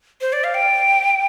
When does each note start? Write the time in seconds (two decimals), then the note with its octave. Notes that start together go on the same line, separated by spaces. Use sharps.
0.21 C5
0.33 D5
0.44 F5
0.54 G5